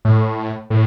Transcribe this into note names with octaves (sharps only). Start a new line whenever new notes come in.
A2
A2